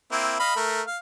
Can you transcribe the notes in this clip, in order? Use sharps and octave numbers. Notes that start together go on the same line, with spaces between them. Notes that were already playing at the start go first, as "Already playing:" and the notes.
A#3 C4 E4
D#5 F5 B5
A3 A#4
F5